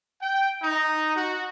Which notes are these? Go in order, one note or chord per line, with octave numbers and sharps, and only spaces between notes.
G5
D#4
F#4